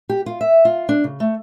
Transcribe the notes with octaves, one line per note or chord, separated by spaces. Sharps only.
G4
F4
E5
F4
D4
C#3
A3